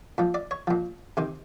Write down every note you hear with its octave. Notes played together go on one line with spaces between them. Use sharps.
A#2 F3
D5
C#5
A#2 F3
C3 D#3 C5